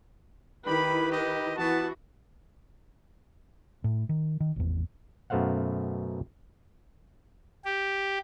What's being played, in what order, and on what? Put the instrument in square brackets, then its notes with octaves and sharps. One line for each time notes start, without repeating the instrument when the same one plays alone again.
[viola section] D#3 E4 B4 [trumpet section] G4 B5
[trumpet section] D#4 G4 D#5
[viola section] E3 F#4 [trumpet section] B3 A5
[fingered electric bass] A2
D#3
D#3
G#1 E2
[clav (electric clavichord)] F#2 B2 A3 C5 F5 F#5
[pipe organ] G4